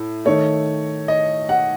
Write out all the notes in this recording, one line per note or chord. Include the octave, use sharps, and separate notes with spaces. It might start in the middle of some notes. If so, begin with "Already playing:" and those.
Already playing: A2
D#3 A3 C#5
D#5
F#5